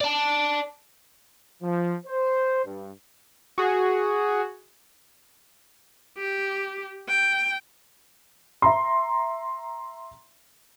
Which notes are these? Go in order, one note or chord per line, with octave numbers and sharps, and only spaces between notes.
D5 A5
F3
C5
G2
F#4 G#4
G4
G5
E5 A#5 C6